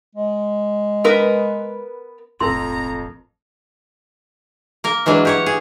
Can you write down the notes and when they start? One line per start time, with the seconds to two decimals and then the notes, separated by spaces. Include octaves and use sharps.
0.15 G#3
1.04 B3 A#4 B4
2.40 E1 A1 F2 A#4 A#5 C6
4.84 A#3 A#4
5.06 E3 F#3 G#3 D4
5.25 G4 C#5 F#5
5.46 G#4